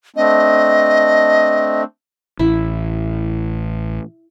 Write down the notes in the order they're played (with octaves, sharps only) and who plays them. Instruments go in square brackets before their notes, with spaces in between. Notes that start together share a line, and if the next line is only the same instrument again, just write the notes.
[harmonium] A3 C4 D4 [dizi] D#5
[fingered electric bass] A1 [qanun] E4